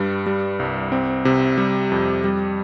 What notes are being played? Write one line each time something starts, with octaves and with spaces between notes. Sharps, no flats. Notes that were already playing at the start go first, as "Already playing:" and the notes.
Already playing: G2 G3
G3
C2
C4
C3
G3
F2
G3